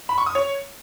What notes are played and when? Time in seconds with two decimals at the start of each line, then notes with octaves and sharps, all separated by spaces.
0.09 B5
0.18 C#6
0.26 D#6
0.35 C#5